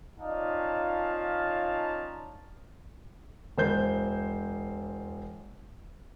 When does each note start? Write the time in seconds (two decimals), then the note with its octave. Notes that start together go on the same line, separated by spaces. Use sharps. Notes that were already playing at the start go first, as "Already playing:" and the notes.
0.19 C#4 D#4 F4 D5 F5 A5
3.58 E1 C5 G6